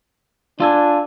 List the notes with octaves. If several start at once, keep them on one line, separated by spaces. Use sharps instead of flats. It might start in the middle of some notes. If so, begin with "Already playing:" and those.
D4 F4 A4 G#5